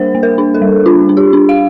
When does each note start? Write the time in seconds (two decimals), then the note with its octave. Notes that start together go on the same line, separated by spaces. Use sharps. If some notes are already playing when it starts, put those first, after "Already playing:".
Already playing: G3 A#3 D4 A#4 C5
0.15 A#3
0.23 A#4
0.38 D4
0.54 A4
0.62 G3
0.86 D4 F4
1.09 D4
1.17 G4
1.33 D4
1.49 F5